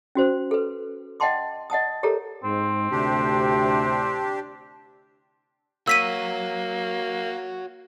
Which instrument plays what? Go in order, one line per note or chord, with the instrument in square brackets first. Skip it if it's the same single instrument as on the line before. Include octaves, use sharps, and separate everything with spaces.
[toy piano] C#4 F#4 C5
A4 B4
D#5 F#5 G5 A5 C6 D6
D#5 F#5 A5 D#6
G4 A4 A#4 C#5 A#5
[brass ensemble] G#2 [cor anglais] C4
[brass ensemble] D2 A2 C3 [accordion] D4 G4
[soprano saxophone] A#3 [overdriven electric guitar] F#4 C#5 [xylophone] E6 B6 D#7